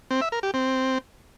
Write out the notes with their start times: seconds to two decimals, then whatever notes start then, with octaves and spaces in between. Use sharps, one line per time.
0.11 C4
0.21 E5
0.32 A#4
0.43 G4
0.54 C4